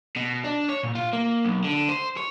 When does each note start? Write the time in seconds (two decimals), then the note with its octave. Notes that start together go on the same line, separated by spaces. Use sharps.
0.17 B2
0.44 D4
0.69 C#5
0.83 A#2
0.95 F4
1.13 A#3
1.45 B1
1.64 D3
1.89 C5
2.17 C#5